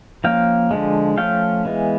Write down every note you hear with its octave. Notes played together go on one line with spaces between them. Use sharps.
F3 A#3 C#4 F5 G5
D3 F3 G#3
F3 A3 C#4 F5 G5
E3 G#3 B3